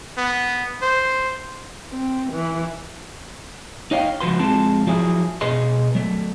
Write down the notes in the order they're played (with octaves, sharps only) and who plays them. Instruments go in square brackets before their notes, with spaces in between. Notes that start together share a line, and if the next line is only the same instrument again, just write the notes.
[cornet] B3
C5
[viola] C4
E3
[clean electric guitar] D#4 C#5 D#5 F5 G5
C#2 F3 F#4 B4 C6
F2 G#3 C4 F4 A5 C6
F3 F#3 E4 G#4
B2 G#4 B4 D#5 C6
F#3 A3